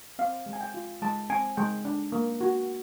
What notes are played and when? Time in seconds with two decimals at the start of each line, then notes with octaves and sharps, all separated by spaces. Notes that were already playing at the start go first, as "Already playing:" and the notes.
0.19 C4 F5
0.46 G#3
0.53 G#5
0.61 G5
0.74 F4
1.02 G#3 A5
1.30 C4 G#5
1.57 G#3 G5
1.85 D4
2.12 A#3
2.41 F#4